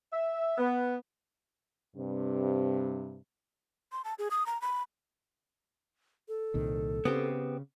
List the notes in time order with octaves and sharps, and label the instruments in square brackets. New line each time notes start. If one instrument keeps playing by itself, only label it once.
[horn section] E5
B3
[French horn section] G2 C3
[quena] C6
A5
G#4
D#6
A#5
B5
[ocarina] A4
[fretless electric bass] C2 A#2 D#3
[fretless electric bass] C#3 [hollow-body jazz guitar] B3 C4 G4